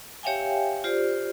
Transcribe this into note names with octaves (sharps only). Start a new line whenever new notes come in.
G4 C#5 E5 F5 G5 G#5
F4 G4 C5 D5